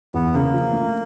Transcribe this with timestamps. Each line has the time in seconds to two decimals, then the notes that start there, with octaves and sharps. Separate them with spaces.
0.14 E2 B3
0.34 C#3 A#3
0.53 F3
0.73 A3